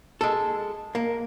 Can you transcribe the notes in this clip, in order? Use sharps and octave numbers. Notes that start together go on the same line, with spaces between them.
G#3 A4
A#3